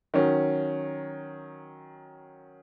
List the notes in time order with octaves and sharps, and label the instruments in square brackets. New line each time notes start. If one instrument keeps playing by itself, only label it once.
[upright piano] D#3 F#3 C#4